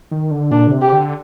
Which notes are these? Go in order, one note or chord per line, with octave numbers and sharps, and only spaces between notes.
D#3
D3
A#2 D4
D3
C3
G4
D3